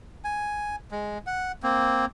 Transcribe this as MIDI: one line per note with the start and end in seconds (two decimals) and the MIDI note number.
0.24 0.76 80
0.91 1.18 56
1.27 1.52 78
1.63 2.06 58
1.63 2.06 60